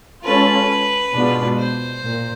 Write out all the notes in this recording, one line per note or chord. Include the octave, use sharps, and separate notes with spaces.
G#3 C#4 F4 A4 B4
B2 G#3 B3 D4 F4
C5
A#2